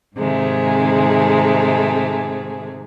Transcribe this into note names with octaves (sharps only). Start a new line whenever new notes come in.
G#2 C3 D#3 G#3 A3 G#4